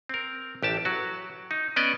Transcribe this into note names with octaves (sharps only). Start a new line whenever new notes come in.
C4 A#4
A1 G4 A5
F#3 F#4
D#4
B3 C#4 D5 D#5